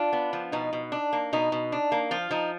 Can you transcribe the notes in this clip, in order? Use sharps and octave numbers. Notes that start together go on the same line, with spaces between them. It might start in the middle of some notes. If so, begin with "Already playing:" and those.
Already playing: D4 F4
B3
F3
B2 D#4
B2
D4
A#3
B2 D#4
B2
D4
A#3
F3 F4
F3 D#4